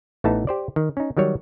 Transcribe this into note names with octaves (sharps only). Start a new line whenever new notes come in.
A1 E3 A3 B3 D#4 A5
G4 C5 D5
D#3
C#4 D#4
D#3 F#3 G3 C#5